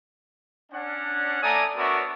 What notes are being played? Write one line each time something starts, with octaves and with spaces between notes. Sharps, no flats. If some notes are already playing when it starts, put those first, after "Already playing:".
C#4 D4 F#5
A3 D4 D5 G#5 A#5 D#6
B3 D4 F#4 A#4 C#5 E5